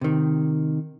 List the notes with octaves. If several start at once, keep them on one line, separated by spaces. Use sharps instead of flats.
C3 D#3